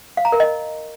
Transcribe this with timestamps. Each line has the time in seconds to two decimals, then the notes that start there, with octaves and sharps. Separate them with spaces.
0.17 F5
0.25 A#5
0.32 A#4
0.40 D#5